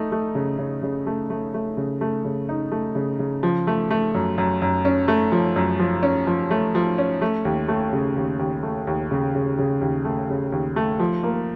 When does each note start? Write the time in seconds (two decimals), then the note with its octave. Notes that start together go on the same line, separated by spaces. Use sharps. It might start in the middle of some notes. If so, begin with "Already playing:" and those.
Already playing: A3 D#4
0.12 A3
0.35 C#3
0.59 C#3
0.83 C#3
1.07 A3
1.30 A3
1.54 A3
1.77 C#3
2.01 A3
2.25 C#3
2.49 D#4
2.72 A3
2.95 C#3
3.19 C#3
3.43 F3
3.67 A3
3.91 A3
4.15 F#2
4.38 F#2
4.62 F#2
4.85 C#4
5.08 A3
5.32 F3
5.56 F#2
5.79 F3
6.03 C#4
6.27 F3
6.51 A3
6.75 F3
6.98 C#4
7.22 A3
7.45 D#2
7.68 A3
7.93 C#3
8.16 D#2
8.39 D#2
8.63 A3
8.87 D#2
9.11 C#3
9.35 C#3
9.59 C#3
9.81 D#2
10.05 A3
10.30 C#3
10.52 D#2
10.76 A3
10.99 F3
11.23 A#3